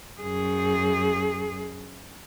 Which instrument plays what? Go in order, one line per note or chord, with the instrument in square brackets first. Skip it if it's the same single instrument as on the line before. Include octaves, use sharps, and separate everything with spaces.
[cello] F#2 G#4